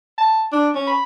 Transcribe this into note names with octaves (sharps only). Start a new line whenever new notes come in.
A5
D4
C#4
B5